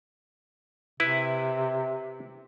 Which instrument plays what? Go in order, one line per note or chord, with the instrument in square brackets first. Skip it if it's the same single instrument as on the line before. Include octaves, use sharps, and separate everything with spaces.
[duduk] C3 [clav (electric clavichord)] E4 B4